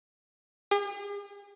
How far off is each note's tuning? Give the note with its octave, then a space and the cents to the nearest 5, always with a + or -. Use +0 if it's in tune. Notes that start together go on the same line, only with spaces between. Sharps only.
G#4 -45